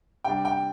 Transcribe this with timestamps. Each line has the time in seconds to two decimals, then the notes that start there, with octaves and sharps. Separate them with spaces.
0.24 C3 G3 D4 G5
0.45 G5